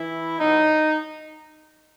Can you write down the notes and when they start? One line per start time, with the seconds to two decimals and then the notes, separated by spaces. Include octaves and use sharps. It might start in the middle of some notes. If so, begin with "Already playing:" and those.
Already playing: E3 E4
0.39 B2 F#3 B3 D#4